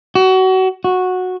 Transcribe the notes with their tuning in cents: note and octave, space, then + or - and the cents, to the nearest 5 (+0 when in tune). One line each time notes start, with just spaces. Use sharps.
F#4 +25
F#4 -10